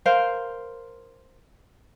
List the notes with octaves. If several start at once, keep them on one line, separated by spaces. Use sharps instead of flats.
A#4 C5 F5